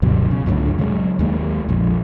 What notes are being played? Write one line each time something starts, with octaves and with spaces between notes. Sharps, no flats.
D2 G2 B2 F#3
C#3
C#2 F#2 A2 D3
C#3 F#3 G#3
D#2 G#3 A#3
A#1 F2